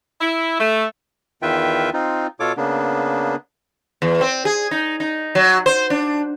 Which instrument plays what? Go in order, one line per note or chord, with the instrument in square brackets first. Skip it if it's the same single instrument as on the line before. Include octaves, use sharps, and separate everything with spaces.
[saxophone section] E4
A3
[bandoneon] E2 D#3 F4 B4 E5 G5
C4 D#4 F4
B2 F4 A4 C#5 D6
C#3 A#3 B3 D4
[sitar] E2
C4
G#4
D#4
D#4
F#3
C5
D4